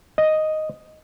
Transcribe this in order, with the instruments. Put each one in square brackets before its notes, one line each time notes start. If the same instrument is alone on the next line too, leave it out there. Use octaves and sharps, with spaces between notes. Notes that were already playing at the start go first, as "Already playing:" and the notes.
[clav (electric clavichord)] D#5